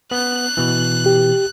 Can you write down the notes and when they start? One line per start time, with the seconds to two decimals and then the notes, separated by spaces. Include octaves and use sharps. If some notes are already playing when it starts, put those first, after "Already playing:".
0.11 B3 F#6
0.57 B2 E3
1.06 G4